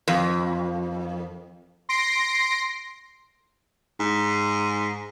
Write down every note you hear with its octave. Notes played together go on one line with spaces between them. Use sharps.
F2
C6 A#6 C7 D7
G#2